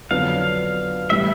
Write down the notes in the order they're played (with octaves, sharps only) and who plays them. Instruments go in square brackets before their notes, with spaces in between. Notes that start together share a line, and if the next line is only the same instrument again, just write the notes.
[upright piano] F2 D3 F#3 B3 D4 [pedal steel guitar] F5
[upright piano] A2 E3 G3 [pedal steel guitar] E5